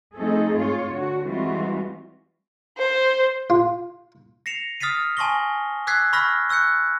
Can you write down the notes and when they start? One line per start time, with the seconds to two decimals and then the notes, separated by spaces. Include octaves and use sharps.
0.17 F3 A3 C4 D#4 G#4 A4
0.55 G#2 F4 C#5
0.92 D3 F#4
1.25 E3 G3 G#3 C4 F4 F#4
2.78 C5
3.50 F4
4.46 A#6 C7 C#7 E7 F7
4.80 D#6 F6 A6 B6 C7 D#7
5.17 G#5 A5 C6 C#6 A#6 G7
5.87 D6 E6 F#6 G#6 B6 C7
6.13 B5 C#6 E6 F6 A#6 B6
6.49 C#6 E6 F#6 G6 C#7